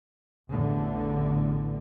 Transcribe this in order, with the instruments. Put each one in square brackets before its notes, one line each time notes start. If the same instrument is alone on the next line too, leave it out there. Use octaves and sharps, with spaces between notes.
[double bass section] A1 E2 A2 D3